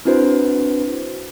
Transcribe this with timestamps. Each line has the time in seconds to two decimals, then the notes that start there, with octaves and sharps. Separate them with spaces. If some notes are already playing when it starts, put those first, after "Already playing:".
0.05 C4 D4 E4 F#4 B4 C5